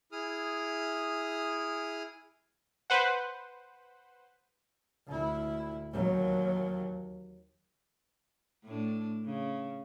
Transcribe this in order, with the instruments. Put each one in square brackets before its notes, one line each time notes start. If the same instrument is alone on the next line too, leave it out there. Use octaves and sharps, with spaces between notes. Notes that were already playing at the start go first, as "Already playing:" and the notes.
[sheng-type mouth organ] E4 G#4 D#6 F6
[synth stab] B4 C5 F#5
[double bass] D2 E4
D#2 F#3
[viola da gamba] A2 D4
C#3